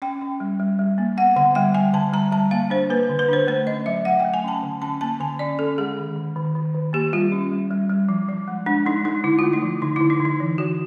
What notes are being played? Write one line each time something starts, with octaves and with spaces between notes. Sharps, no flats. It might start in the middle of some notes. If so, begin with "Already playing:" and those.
C#4 G5
C#4
G3
G3
G3
A#3
B3 F#5
D3 F#5
G3 G5
G3 G#5
D3 A5
G3 A#5
G3 A5
A#3 F5
D4 C5
A#3 B4
D3
B4
D4 C5
A3 C5
C#4 D#5
F#3 E5
F#3 F#5
A3 G5
G#5
C#4 A5
D3
C#4 A5
A#3 A5
D3 G#5
C#4 D5
C#4 A4
G#3 G#4
D#3
D#3
D#3
D#3
D#3
A#3 G4
G3 F4
C#4
G3
G3
G3
F3
F3
G#3
G#3 D4
G#3 D#4
G#3 D#4
D3 E4
A3 F4
D#4
F3
D3 D#4
D3 E4
D#4
D3
D#4
E3
E3 F#4